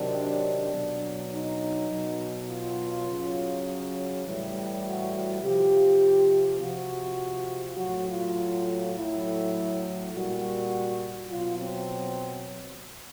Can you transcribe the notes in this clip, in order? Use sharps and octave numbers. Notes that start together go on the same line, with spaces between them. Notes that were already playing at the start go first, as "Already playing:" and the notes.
Already playing: C3 D#3 F#3 D4
B2 F#3
D#4
B2 F#3
F4
C#3 F#3
A2 E3 G3
F#4
F#4
C3 F3 G4
C3 F3 F#4
A2 F#3 F#4
F4
A2 F#3 E4
A#2 G3 F#4
B2 F#3 F4
C4